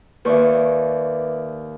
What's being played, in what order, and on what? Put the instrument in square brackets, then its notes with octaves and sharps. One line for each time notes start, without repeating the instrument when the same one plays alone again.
[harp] D#2 C#6 [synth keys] B4 D5 E5